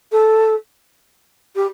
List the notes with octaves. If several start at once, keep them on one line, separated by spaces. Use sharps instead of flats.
A4
G4